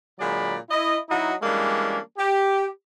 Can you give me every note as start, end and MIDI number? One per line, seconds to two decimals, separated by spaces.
0.19 0.57 46
0.19 0.57 50
0.19 0.57 54
0.19 0.57 56
0.19 0.57 74
0.19 0.57 83
0.70 0.97 64
0.70 0.97 75
1.09 1.34 54
1.09 1.34 63
1.09 1.34 64
1.09 1.34 66
1.09 1.34 75
1.42 1.98 52
1.42 1.98 55
1.42 1.98 56
1.42 1.98 58
1.42 1.98 61
1.42 1.98 62
2.17 2.67 67